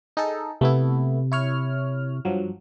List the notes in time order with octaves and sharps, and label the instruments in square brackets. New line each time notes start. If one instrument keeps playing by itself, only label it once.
[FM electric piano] D#4 G#4 A4
[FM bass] C3 [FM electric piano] A3 B3 E4
[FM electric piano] E4 C#5 F6
G2 F3 F#3